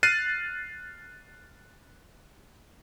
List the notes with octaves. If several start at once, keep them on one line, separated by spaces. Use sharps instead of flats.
F6 F#6 A6 C7 D#7